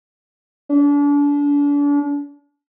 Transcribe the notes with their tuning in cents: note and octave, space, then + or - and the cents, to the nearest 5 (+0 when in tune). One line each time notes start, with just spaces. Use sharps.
D4 -35